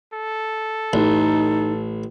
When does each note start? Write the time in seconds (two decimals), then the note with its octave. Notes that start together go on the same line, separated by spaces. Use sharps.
0.13 A4
0.93 A1 D#4